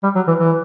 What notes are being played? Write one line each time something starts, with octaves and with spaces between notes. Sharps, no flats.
G3
F#3
E3
E3